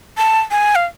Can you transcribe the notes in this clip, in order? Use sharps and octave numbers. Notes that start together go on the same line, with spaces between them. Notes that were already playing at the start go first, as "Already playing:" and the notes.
A5
G#5
F5